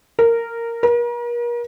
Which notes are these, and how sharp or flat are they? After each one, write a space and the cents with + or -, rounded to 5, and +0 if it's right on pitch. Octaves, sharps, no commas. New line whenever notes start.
A#4 -10
A#4 +40